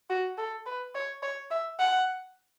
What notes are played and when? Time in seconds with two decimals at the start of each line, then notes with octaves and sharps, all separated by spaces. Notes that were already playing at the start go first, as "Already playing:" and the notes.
0.10 F#4
0.38 A4
0.66 B4
0.95 C#5
1.22 C#5
1.51 E5
1.79 F#5